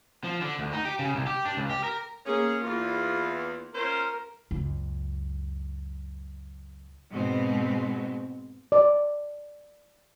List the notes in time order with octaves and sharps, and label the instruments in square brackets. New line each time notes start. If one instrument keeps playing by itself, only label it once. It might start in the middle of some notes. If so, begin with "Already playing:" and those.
[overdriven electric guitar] F3
D3
D2
D#4
G4
C#3
C2
G4
D4
C#2
G4
A#4
[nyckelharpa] A#3 G#4 [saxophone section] C#4
[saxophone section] E2 [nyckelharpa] F4
[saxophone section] C#4 F4 C5 [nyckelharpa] A#4
[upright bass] C#2 F#2
[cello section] G#2 B2 G#3 C4
[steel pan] D5